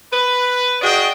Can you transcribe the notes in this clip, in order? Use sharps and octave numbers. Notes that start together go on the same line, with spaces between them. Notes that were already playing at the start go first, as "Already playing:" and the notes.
B4
F#4 G#4 D5 D#5 G5